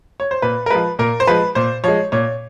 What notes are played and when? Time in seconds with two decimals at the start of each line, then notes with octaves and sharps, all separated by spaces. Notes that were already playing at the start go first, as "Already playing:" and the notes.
0.20 C#5
0.31 C5
0.42 A#2 B4
0.66 A#4
0.70 F3 G#3 B4
0.99 A#2 A#4
1.20 C5
1.27 F3 G#3 B4
1.55 A#2 C5
1.84 F3 G#3 C#5
2.12 A#2 C#5